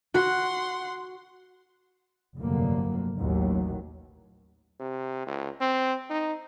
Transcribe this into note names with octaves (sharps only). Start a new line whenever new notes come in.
F#4 F#5 C6
F1 D2 G2 D3 F#3 A#3
A1 D#2 A2 D#3 F#3
C3
C#2
C4
D#4